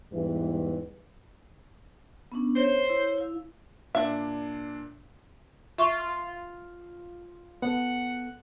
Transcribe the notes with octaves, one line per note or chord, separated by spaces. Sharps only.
E2 G#2 E3 G3 B4
B3 C#4 D4
C5 C#5
E4 C#5
E4 F5
A#2 D4 E5
F4 E5 C6 C#6
B3 A4 F#5